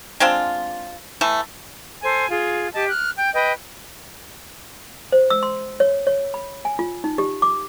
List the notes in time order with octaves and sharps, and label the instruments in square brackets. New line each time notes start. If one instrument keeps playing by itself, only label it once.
[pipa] G#3 C4 D4 F4
E3 A3
[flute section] A4 C5 G#5
F4 G#4
G4 D#5 A5
F6 F#6
G5
B4 D#5 G5
[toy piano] C5
E6
C6
C#5
C#5
B5
G#5
F4
D#4
G4
D6